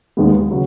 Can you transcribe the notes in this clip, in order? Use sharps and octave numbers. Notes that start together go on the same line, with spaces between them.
D#2 D#3 G#3 B3
C#3 F#3